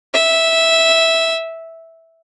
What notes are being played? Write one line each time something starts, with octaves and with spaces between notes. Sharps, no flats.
E5